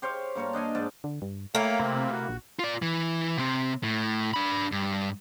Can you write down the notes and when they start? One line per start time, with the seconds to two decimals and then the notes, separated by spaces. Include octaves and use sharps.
0.02 G4 C5 C#5 F5
0.35 G2 A#3 C#5 A5
0.53 D4 D#5 F5 G#5
0.75 G#2 D5 A5
1.04 D3
1.22 G2
1.55 A3 A#3 E4 C#5 F5 G5
1.80 C3 C4
2.12 F#4
2.29 A#1
2.59 F4 D5
2.82 E3
3.37 C3 C4
3.83 A2
4.34 D4 B5
4.72 G2